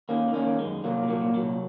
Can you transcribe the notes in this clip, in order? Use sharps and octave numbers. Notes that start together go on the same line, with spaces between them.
D#3 A#3 C#4
D#3
A#3 C#4
D#3
G#3
F#2
C2 F#3 A#3
A#2
F#3 A#3
A#2
F#3
C2